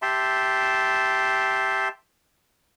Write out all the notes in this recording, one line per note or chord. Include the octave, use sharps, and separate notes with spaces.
G4 E5 A5 C6